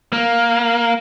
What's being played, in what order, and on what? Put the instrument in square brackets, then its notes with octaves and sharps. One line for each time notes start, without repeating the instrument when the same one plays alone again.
[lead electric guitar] A#3